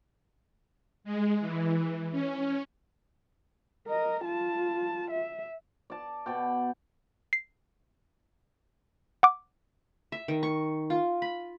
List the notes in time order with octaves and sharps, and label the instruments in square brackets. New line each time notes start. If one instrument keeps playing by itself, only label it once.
[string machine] G#3
E3
C#4
[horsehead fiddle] A#4 D#5
F4 A5
E5
[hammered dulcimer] D5 A5
B2 D5 G5
[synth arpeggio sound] C7
F#5 D6
[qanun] E5
D#3
C#6
F4
B5